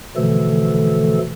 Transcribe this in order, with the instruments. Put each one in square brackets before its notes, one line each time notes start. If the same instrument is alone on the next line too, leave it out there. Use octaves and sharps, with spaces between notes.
[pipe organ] B2 D3 E3 F3 A3 A4